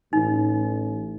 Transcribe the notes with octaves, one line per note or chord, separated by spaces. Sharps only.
A1 D#4